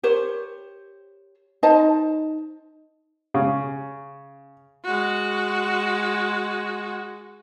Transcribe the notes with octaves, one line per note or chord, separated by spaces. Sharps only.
G4 A#4 C5 C#5
D#4 C5 D#5 A5
C#3
G#3 F#4